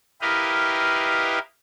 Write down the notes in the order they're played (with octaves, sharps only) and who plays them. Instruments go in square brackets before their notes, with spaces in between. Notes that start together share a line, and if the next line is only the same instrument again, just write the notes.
[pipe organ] E4 G4 A#4 B4 D#5 F5